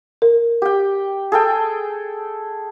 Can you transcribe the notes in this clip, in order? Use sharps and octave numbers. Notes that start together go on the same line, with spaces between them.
A#4
G4 G5
G#4 A4 G5